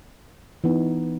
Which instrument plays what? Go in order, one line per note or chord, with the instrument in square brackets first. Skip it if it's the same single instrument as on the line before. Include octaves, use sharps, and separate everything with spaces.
[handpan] E3 B3 D#4